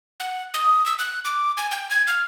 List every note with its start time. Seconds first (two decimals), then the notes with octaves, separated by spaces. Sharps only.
0.20 F#5
0.54 D#6
0.86 E6
0.99 F#6
1.25 D6
1.57 G#5
1.71 G5
1.91 G#6
2.07 F6